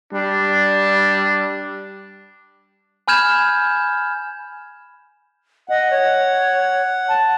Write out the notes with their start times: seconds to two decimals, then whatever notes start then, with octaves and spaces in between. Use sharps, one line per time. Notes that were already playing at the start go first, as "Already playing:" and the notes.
0.13 G3 D4
3.08 G#5 B5 F6 G6 G#6 E7
5.69 D#5 F#5
5.91 C#5
7.08 A5